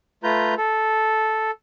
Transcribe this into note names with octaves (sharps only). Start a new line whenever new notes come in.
A3 F4 B4 A#5 G6
A4